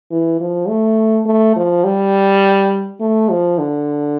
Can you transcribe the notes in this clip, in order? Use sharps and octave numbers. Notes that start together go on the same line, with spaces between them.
E3
F3
A3
A3
F3
G3
A3
F3
D3